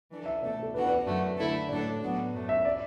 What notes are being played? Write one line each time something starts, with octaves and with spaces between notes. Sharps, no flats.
E3 D4 A4
E5
B2 A3 D4 A4 D5
A4
E2 E3 D4 F#4 B4
B4
D5
F#2 D3 A3 F#4
D3 A3 E4 A4
A2 F#3 D4 A4 D5
A2 F#3 B3 D4 F#4
F#2 F#3 A3
E5
D5